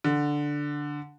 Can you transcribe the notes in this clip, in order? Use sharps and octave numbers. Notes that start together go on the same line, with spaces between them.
D3